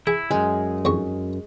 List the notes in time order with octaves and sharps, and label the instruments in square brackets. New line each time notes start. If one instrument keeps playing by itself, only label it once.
[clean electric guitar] E4 [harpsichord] G#4
[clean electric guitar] C#2 F#2 [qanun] G#3
[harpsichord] F2 G#2 C#6